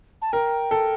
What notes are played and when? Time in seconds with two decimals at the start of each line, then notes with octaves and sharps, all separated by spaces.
0.22 A5
0.32 A#4 G5
0.71 A4